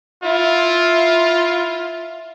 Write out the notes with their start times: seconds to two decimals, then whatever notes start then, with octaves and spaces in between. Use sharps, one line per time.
0.23 E4 F4